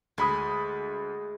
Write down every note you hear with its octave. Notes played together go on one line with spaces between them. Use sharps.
D2 G#3 B5 D#6